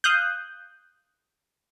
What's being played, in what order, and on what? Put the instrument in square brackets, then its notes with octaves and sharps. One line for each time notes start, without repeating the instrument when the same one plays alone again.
[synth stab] F5 D#6 F#6 G6